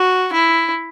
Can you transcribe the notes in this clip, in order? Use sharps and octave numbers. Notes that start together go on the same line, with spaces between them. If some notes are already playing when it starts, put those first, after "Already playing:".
Already playing: F#4
E4